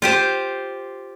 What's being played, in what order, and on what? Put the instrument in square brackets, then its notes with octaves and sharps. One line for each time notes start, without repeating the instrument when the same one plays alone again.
[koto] F4 G4 C5